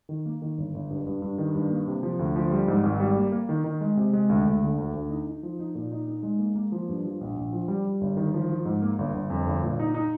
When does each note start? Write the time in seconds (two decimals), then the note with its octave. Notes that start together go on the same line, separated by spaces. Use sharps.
0.09 D#3
0.26 A#3
0.42 D#3
0.58 G1
0.74 G1
0.91 G2
1.07 G2
1.22 G2
1.38 D#3
1.55 G2
1.70 A#3
1.88 C3
2.03 F3
2.19 D2
2.36 F3
2.51 G3
2.68 G#2
2.83 G#1
3.00 G3
3.17 A#3
3.32 A#3
3.49 D#3
3.64 D#3
3.81 G#3
3.97 C3
4.13 G#3
4.29 D2
4.45 D2
4.62 D3
4.78 D2
4.93 D2
5.10 D#4
5.27 D#4
5.43 F3
5.59 D#4
5.75 A#2
5.92 D#4
6.08 D#4
6.23 G#3
6.39 A#3
6.55 A#3
6.72 F3
6.89 G2
7.05 F3
7.21 A#1
7.37 A#1
7.53 F3
7.68 G3
7.85 G3
8.01 G1
8.17 D#3
8.34 F3
8.50 F3
8.65 G#2
8.82 A#3
8.99 G1
9.14 G1
9.30 F2
9.47 G1
9.63 A#2
9.80 D#4
9.94 D#4